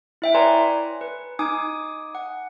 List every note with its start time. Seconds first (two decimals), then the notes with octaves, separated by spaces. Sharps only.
0.22 E4 E5 G5
0.35 B4 C#5 D5 G#5 A#5 C6
1.01 B4
1.39 D#4 G#5 D6 D#6
2.15 F#5